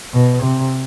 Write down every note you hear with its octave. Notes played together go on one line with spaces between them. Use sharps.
B2
C3